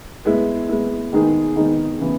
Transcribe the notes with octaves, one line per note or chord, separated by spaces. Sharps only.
G#3 B3 E4
G#3 B3 E4
D#3 G#3 B3 D#4 G#4
D#3 G#3 B3 D#4 G#4
C#3 E3 B3